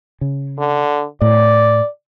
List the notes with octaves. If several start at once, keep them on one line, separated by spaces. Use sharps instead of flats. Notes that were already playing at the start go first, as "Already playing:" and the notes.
C#3
D3
A2 D5